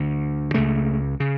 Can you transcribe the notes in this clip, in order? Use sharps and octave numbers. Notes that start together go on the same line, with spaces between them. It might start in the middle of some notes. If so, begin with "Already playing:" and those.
Already playing: D2 D3
C#2 C#3 A3
C#3